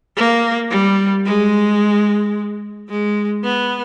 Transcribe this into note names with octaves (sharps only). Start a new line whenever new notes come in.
A#3
G3
G#3
G#3
B3